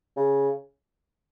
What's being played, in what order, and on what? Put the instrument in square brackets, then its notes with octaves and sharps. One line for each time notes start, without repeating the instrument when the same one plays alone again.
[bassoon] C#3